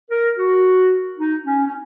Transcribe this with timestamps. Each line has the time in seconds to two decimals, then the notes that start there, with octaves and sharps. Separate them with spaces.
0.10 A#4
0.37 F#4
1.18 D#4
1.45 C#4
1.67 C#4